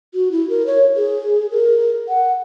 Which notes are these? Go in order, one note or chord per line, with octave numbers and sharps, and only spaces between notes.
F#4
E4
A#4
C#5
G#4
A#4
F#5